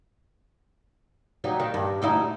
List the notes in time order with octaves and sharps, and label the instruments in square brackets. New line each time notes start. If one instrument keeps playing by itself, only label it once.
[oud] F#3 G3 D#4
D#3
G2
D2 D#4 E4